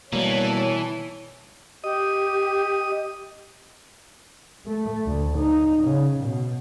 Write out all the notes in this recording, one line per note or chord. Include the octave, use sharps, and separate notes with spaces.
B2 E3 G3 A#3 C#5 A5
G4 D#5 D#6
A3
D2
D#4
C#3
B2